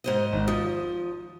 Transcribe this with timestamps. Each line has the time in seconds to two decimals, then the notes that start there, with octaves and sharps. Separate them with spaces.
0.04 G#2 C5 D#5
0.33 G#1 D#3
0.48 F3 D#6